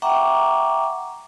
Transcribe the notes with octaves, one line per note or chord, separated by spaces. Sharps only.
E5 F#5 G5 A#5 C#6 D6